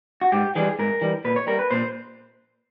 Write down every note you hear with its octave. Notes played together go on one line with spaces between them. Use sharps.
F#4
G#2 G4
E3 G3 G#4
G#2 A#4
E3 G3
A#2 B4
C#5
G3 A#4
B4
A#2 C5